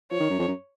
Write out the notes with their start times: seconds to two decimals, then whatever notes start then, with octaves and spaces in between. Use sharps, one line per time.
0.11 F3 C#5
0.20 D#3
0.30 F#2
0.39 F2
0.48 F#2